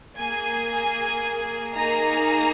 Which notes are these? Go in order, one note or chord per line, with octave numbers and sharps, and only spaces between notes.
A#3 G#4 G#5
A#3 D#4 G#4 A#5